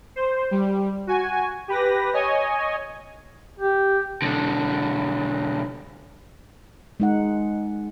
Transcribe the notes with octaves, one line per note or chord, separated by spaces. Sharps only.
C5
G3
F#4 G#5
G4 B4 A#6
C#5 D#5 G#5
G4
B1 D3
G#3 D#4 F#5